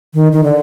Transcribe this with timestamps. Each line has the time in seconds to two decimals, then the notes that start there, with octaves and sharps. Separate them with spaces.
0.14 D#3
0.32 D#3
0.44 D3